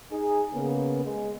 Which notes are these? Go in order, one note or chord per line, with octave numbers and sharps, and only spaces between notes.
D#4 G#4
C#3 A#3 B3
G#3